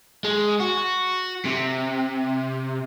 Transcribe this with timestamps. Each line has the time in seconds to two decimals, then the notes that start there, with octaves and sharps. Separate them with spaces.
0.25 G#3
0.61 F#4
1.46 C3